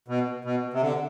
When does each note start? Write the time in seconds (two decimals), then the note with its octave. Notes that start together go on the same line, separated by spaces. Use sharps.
0.08 B2
0.45 B2
0.73 C3
0.82 D3